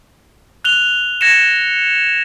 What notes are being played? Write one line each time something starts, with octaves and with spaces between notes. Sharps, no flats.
F#6 F7 G7
G#6 A#6 C#7 E7